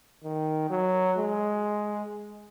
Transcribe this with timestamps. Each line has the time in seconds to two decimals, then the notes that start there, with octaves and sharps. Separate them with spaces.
0.24 D#3
0.70 F#3
1.18 G#3